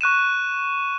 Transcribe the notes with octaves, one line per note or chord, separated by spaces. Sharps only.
C#6 F#6 D#7 E7